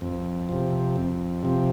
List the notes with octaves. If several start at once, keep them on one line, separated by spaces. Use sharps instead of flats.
F2
C3 F3
F2
C3 F3